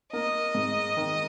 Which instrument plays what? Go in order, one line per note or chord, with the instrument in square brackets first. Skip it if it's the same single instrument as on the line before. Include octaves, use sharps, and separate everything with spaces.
[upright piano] A#3 [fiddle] D#5
[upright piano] G#2
D#3